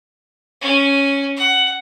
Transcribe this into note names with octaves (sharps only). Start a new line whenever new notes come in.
C#4
F#5